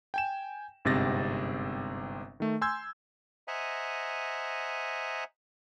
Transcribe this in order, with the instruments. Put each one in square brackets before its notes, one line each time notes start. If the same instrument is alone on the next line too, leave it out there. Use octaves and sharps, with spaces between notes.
[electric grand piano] G5 G#5 E7
G1 G#2 C3 C4 A6 A#6
D#3 A3
G#5 C6 E6 G6 G#6
[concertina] C5 D#5 E5 F#5 G#5 A#5